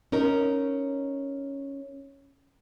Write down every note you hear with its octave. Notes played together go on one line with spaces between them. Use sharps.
C#4 D#4 A#4